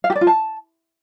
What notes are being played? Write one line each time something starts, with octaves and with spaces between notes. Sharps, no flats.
F5
G4
D5
F4
A5